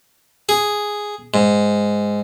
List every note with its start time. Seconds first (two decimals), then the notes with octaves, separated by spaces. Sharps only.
0.49 G#4
1.34 G#2